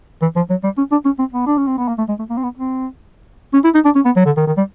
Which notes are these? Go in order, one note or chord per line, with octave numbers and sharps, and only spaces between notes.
E3
F3
F#3
G3
C#4
D4
C#4
C4
B3
D4
C#4
C4
B3
A#3
A3
G#3
A3
A#3
C4
B3
C4
C#4
E4
D#4
D4
C#4
B3
F#3
D3
D#3
D#3
G3